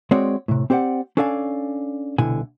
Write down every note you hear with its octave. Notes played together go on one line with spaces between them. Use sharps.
G#3 C4 F#4 C#5 D5
A2 C3
C4 G4 C5 D5 F#5
C#4 D4 A4 D5 F5 G#5
C2 B2 D3 E4 G#5